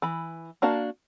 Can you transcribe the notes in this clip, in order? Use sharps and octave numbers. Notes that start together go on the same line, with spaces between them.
E3 B5
A#3 D4 F#4 F5 A5